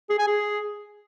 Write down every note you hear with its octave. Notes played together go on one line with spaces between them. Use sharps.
G#4
G#5
G#4